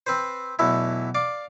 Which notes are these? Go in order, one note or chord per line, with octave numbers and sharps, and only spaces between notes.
C4 B4 C5
B1 E2 E3 A3 E4
D5 F5 D6